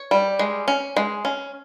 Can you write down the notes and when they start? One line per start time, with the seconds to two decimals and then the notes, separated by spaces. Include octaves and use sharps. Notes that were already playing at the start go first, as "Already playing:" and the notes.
Already playing: C#5
0.11 G3
0.39 G#3
0.68 C#4
0.97 G#3
1.25 C#4